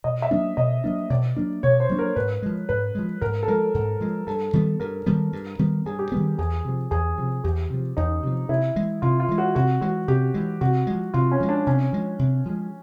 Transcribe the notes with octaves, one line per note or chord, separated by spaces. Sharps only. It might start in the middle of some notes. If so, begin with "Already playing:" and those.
B2 D#5
E5
F#3 A#3 D4
B2 D#5
F#3 A#3 D4
B2 D5
F#3 A#3 D4
B2 C#5
C5
F#3 A#3 D4
A#4
G#2 B4
F3 G#3
G#2 B4
F3 G#3
G#2 A#4
A4
F3 G#3 A#4
G#2
F3 G#3
G2 A4
D#3 G3 B3
G2 A#4
D#3 G3 B3
G2
D#3 G3 B3
G2 G#4
G4
D#3 G3 B3
E2 G#4
C3 F3
E2 G#4
C3 F3
E2 G4
C3 F3
E2 D#4
C3 F3
C3 E4
E3 G#3
C3 F4
F4
E3 G#3
F#4
C3 F#4
E3 G#3 F#4
C3 G4
E3 G#3
C3 F#4
F3 G#3
C3 F4
C#4
F3 G#3
D4
C3 C#4
F3 G#3
C3
F3 G#3